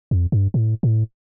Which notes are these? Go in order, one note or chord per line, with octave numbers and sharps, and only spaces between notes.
F2
G2
A2
A2